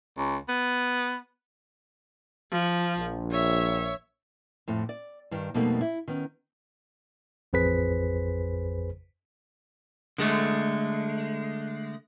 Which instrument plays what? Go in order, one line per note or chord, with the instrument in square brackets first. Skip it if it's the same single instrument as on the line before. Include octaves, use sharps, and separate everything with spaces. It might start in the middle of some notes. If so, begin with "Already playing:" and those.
[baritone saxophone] C#2
B3
[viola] F3
[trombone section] A#1
[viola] C#5 E5
[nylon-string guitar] F2 A2
D5
G2 D#3
F2 B2 G3 A3 A#3 D#4
E4
D#3 B3 C#4
[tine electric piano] A1 F2 G#4 B4 C5 B6
[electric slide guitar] D3 G#3 A3